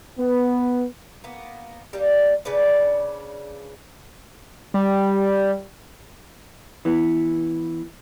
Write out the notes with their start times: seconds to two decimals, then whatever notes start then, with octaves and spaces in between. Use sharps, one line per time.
0.18 B3
1.24 A#3 B3
1.93 G3 A#3
2.45 C#3 D4 B4 D5
4.74 G3
6.85 E3 B3